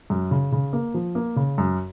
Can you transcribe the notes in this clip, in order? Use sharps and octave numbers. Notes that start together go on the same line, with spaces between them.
F#2
C#3
C#3
A#3
F3
A#3
C#3
F#2